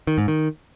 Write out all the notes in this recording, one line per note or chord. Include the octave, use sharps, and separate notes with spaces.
D#3
G#2
D#3